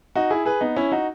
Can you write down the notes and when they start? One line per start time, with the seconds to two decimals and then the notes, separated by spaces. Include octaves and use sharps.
0.15 D#4 F#4
0.30 E4 G#4
0.46 G#4 B4
0.61 B3 D#4
0.76 C#4 E4
0.92 D#4 F#4